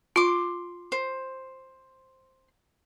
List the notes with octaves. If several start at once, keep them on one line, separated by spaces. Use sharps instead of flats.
F4 C6 D6
C5